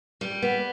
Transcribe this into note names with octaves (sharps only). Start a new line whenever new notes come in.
G3
B3